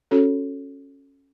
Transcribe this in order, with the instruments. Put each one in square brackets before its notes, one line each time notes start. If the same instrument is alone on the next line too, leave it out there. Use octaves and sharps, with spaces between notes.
[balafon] C#4 F#4 A4 C#5